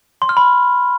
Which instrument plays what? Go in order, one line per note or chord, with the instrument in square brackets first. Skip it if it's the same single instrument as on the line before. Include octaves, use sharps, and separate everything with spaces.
[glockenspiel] C6
F6
B5